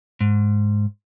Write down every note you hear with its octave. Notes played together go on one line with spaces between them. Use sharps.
G#2